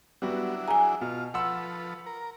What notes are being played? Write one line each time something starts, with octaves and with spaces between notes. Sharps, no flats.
F#3 G3 B3 D4 E4 F#4
G#4 G#5 A#5
B2 F4
F3 A4 B4 F#5 C6 E6
A#4